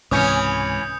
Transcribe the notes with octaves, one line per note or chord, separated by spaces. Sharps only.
C#2 G#2 C3 E3 C#4 D#6 G6 C#7